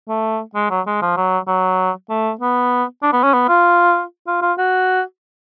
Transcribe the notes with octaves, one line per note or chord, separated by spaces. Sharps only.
A3
G#3
F#3
G#3
F3
F#3
F#3
A3
B3
D4
B3
C#4
B3
F4
F4
F4
F#4